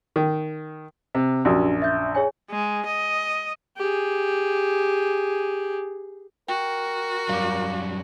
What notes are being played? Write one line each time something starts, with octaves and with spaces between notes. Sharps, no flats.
D#3
C3
A#1 F#2 D4 F#4 G4
E5 G6
G#4 C#5 G#5
G#3
D#5
G4 G#4
F#4 A#4 G5
F#2 G3 F5 D6